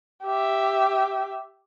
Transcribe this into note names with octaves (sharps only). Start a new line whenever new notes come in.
G4 E5